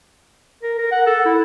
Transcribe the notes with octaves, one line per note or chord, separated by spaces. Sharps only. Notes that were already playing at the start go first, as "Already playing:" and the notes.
A#4
A#4
F#5
A4
E4